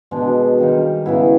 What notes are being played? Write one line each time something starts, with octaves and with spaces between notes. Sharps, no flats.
B2 G#3 B3 D4
D#3 G3 A#3 D#4
C#3 F#3 B3 E4